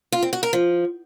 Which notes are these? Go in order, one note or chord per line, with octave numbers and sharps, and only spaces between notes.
F4
C4
F#4
A#4
F3